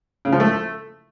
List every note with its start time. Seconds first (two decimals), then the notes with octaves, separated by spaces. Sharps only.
0.25 C#3
0.32 F3
0.40 A3